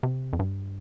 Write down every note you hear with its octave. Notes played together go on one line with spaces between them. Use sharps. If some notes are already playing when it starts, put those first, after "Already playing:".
C3
F2
G2